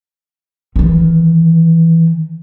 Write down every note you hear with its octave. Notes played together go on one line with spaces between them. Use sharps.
D#3 E3